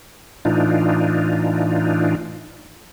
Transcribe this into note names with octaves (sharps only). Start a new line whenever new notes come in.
A2 E3 D4 D#4 F4